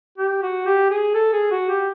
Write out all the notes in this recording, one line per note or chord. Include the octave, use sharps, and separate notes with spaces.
G4
F#4
G4
G#4
A4
G#4
F#4
G4